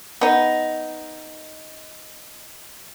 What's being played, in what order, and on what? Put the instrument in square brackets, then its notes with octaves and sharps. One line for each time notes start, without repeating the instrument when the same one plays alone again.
[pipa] B3 D#4